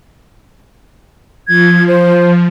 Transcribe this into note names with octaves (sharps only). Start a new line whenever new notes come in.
F3 G#6
C5